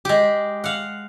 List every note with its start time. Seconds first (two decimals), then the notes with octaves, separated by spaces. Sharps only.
0.05 G#3 G4
0.64 F5 F#5